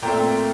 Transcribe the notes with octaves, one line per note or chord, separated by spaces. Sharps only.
A#2 A3 C4 G5 A#5